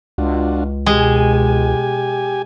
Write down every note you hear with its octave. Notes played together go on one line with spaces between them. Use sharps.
C#2 D4 F4 F#4
B2 G#3 G4 G#5